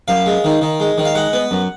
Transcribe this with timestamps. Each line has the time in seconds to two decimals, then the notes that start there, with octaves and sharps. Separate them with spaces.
0.08 F#2 F5
0.26 G#3
0.44 D#3
0.62 D#3
0.80 G#3
0.98 D#3
1.05 F5
1.15 G#3 F#5
1.33 B3
1.51 F#2